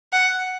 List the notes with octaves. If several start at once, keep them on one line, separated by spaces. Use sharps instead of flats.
F#5